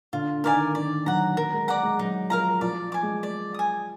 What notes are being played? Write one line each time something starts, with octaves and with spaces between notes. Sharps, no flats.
D3 F4
D#3 A#4 D5 G#5
D#3 D5
F#3 F#5 A#5
F#3 A#4
G#3
D5 F#5 A#5
G#3
F#3 D#4
F3 A#4 F5 A#5
F3 D5
G#5 D6
G#3
D5
G#5 D#6